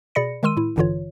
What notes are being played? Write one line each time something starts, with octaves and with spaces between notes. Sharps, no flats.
B2 G#4 D5 B5 A#6 C#7
D#3 G#3 A#4 C6 E6 D#7
A2 E4
A1 G2 D3 E3 F4 C#5